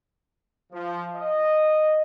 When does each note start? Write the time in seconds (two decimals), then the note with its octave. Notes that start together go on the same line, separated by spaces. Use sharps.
0.72 F3
1.16 D#5